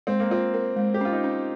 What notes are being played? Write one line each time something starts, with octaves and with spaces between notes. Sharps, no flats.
G#3 C4
A#3
C4 F4
A#4
G#3
G4
C#4 F4
D#4
C#4